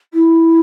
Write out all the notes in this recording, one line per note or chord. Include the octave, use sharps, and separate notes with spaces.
E4